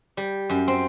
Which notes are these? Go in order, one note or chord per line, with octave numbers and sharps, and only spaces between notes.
G3
F#2
C4